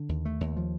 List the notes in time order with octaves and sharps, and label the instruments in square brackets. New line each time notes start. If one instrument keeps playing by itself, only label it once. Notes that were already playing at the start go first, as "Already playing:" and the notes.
Already playing: [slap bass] D3
D#2
A3
D#2
F3